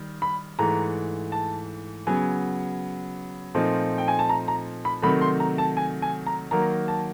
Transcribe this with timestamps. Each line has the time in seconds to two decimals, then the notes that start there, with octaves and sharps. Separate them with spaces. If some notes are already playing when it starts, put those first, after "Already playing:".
Already playing: D#3 G3
0.22 B5
0.59 G#2 E3 A3 A#5
1.32 A5
2.07 C#3 F#3 B3 G#5
3.55 A#2 F3 A3 C4 D#4
3.98 G5
4.08 G#5
4.19 A5
4.29 A#5
4.48 A#5
4.85 B5
5.02 C3 D#3 F#3 A3 B5
5.21 C6
5.40 A#5
5.58 A5
5.77 G#5
6.02 G#5
6.27 A#5
6.51 D#3 F#3 A#3 A#5
6.88 A5